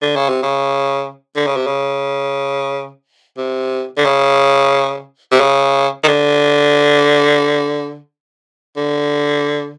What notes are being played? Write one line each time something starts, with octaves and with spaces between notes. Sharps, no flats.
D3
C#3
C3
C#3
D3
C#3
C3
C#3
C3
D3
C#3
C3
C#3
D#3
D3
D3